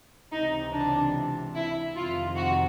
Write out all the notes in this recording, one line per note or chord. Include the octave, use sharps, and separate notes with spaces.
C#2 C3 E3 D#4
D4
E4
F2 C3 D#3 F4
F#4